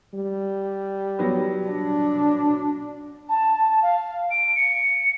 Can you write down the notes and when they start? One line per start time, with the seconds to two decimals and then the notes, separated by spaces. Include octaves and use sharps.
0.14 G3
1.19 F#3 B3
1.67 D4
3.29 A5
3.82 F5
4.31 D7
4.56 C#7